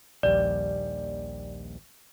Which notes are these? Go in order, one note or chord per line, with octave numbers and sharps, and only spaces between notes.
A#1 D#2 G3 D5